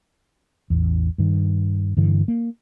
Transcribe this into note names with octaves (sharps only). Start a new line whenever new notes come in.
A1 E2
G2 D#3
G2 D3 E3
A#3